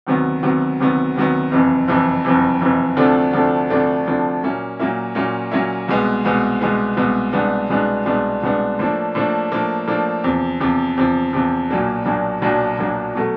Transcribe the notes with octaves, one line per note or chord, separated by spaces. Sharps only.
D2 C3 D#3 F#3 B3
D2 C3 D#3 F#3 B3
D2 C3 D#3 F#3 B3
D2 C3 D#3 F#3 B3
F#1 F2 C3 E3
F#1 F2 C3 E3
F#1 F2 C3 E3
F#1 F2 C3 E3
D2 C3 F3 A3 D4
D2 C3 F3 A3 D4
D2 C3 F3 A3 D4
D2 C3 F3 A3 D4
A#2 F#3 A#3 C#4 E4
A#2 F#3 A#3 C#4 E4
A#2 F#3 A#3 C#4 E4
A#2 F#3 A#3 C#4 E4
C2 B2 G#3 B3
C2 B2 G#3 B3
C2 B2 G#3 B3
C2 B2 G#3 B3
C2 B2 G#3 B3 D4
C2 B2 G#3 B3 D4
C2 B2 G#3 B3 D4
C2 B2 G#3 B3 D4
A2 F3 A#3 D4
A2 F3 A#3 D4
A2 F3 A#3 D4
A2 F3 A#3 D4
E2 C3 F3
E2 C3 F3
E2 C3 F3
E2 C3 F3
B1 A#2 F#3 A#3 D4
B1 A#2 F#3 A#3 D4
B1 A#2 F#3 A#3 D4
B1 A#2 F#3 A#3 D4
B2 F#3 A3